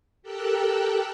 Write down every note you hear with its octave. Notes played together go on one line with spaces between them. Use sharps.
G4 A4 A#4 G5 E6 F#6